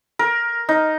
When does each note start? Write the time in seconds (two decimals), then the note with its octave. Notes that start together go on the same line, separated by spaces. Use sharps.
0.19 A#4
0.69 D#4